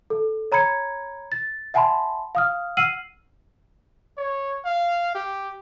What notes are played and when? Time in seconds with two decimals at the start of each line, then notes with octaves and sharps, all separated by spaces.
0.10 A4
0.52 C#5 A#5 B5 G#6 C#7
1.32 A6
1.74 E5 F#5 G#5 A5 B5 C6
2.35 F5 D#6 F6
2.77 F#5 E6 F6 C7 D#7 F#7
4.18 C#5
4.65 F5
5.15 G4